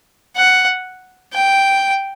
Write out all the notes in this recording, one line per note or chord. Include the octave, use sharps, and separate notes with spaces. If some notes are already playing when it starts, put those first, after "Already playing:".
F#5
G5